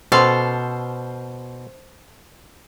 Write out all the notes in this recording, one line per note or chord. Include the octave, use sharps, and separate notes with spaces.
B2 C#4 A4 C5 F5 C6